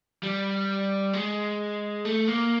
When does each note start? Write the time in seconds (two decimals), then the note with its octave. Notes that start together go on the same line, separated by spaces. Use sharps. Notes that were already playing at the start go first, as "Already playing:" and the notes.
0.23 G3
1.13 G#3
2.05 A3
2.28 A#3